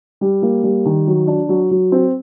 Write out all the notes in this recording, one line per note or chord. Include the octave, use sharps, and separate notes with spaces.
G3
A#3
G3
D#3
F#3
D4
F#3
F#3
C4